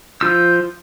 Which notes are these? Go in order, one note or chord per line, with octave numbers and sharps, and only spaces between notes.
F3 F4 E6 G6